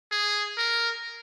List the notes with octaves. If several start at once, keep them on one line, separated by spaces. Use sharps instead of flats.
G#4
A#4